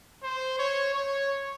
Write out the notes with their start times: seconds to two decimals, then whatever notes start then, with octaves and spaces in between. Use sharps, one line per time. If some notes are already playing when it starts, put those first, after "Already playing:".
0.23 C5
0.59 C#5
0.95 C#5